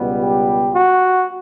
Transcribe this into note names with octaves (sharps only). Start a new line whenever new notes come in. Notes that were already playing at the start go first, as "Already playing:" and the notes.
Already playing: C#2 B2 G3 B3
G4
F#4